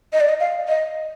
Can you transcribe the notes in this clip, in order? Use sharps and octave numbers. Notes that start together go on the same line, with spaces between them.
D#5
D5
D#5
F5
D#5